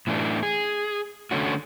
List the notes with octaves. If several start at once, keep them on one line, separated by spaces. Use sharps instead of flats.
A2 E3 A3 D4
G#4
D3 A3 C#4 F#4